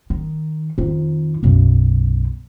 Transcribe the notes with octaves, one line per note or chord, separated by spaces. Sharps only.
D#3
F2 D#3
B1 F#2